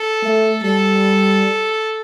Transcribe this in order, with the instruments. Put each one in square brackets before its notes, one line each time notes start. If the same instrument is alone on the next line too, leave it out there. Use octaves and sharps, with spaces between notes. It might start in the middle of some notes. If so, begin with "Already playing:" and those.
Already playing: [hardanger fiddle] A4
[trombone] A3
[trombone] G3 [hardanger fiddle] A4